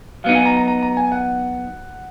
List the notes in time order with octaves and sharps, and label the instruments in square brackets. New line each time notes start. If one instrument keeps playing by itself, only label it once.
[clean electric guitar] F#3 B3 D#4 [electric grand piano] F5
[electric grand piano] G#5
A#5
A#5
A#5
A#5
G#5
F#5